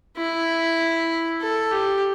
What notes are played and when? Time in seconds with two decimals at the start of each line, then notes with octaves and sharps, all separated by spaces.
0.18 E4
1.41 A4
1.71 G4